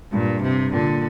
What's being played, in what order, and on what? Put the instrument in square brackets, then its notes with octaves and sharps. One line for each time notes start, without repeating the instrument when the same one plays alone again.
[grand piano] G2 [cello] A#2
[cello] C3
[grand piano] A#2 [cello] D3